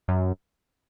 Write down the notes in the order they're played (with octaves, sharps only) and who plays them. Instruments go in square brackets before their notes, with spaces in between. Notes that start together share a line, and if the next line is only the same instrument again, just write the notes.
[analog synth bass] F#2